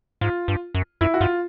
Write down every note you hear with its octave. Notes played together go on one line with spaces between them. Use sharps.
G#2 F4
G2
F#2
F#2 E4
F#4
G2 F4